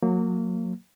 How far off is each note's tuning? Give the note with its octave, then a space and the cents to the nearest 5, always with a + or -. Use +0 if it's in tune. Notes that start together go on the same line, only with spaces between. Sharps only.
F#3 -30 A#3 -25